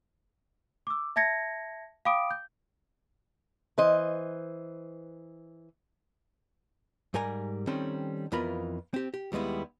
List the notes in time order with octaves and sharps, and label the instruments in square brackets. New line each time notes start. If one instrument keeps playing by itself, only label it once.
[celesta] D6 E6
E5 A5 G#6 A#6 C#7
F5 G5 B5 D6 D#6 D7
G6
[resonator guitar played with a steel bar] E3 C5 D#5
[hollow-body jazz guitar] G#2 G3 A#4 G#5 A#5
D#3 G3 C4 C#4 A4
F2 E3 B3 F4 A#4 B5
C4 G4
G4
D#2 G3 G#3 B3 E4